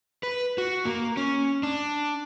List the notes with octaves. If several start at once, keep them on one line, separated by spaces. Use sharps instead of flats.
B4
F#4
A#3
C#4
D4